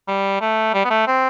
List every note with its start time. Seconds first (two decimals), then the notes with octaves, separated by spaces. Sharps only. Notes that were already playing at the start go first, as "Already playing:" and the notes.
0.08 G3
0.41 A3
0.74 G3
0.85 B3
0.90 A3
1.07 C4